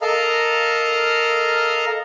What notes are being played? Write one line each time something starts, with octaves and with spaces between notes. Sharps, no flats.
A4 A#4 D#5 F5 A#5 F6